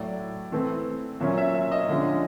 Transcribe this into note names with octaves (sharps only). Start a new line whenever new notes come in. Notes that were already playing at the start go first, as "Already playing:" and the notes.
Already playing: A2 F#3 A3 D5
E3 A3 C4
A#2 F#3 A#3 C#4 E5
E5
E5
D#5
D3 F3 G#3 C#4